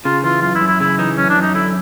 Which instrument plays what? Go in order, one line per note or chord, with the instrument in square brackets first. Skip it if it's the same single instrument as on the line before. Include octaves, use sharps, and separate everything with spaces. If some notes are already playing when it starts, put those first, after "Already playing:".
[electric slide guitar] C#3 [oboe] F4
[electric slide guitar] E3 [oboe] F4
[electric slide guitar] F#2 [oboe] F4
[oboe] E4
[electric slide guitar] F#2
[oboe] E4
[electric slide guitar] C#3 [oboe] E4
[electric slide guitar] E3 [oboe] D#4
[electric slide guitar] F#2 [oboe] C#4
[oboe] D4
[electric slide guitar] F#2
[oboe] D#4
[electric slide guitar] D3 [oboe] E4